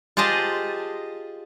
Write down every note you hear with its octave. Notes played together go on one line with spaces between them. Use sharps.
F4 G4 G#4 C5 D#5 A5